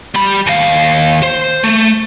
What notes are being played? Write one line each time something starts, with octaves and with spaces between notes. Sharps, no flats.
G3 B5
D#2 F5
C5
A3